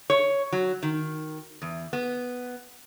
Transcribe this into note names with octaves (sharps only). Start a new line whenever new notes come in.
C#5
F#3
D#3
E2
B3